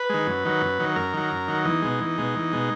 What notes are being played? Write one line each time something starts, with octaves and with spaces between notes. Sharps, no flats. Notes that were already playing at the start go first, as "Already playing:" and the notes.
Already playing: B4
D#3 G#3
F#2
D#3 F#3
F#2
D#3 F#3
F#2 A#4
D#3 F#3
F#2
D#3 F#3
E2 D#4
B2 G#3
E2
B2 G#3
E2
B2 G#3